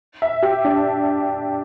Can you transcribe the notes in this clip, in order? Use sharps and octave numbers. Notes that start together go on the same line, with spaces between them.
E5
G4
D4